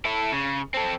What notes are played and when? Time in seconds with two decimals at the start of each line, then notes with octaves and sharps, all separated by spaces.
0.05 E4 A4
0.32 C#3
0.74 C4 A4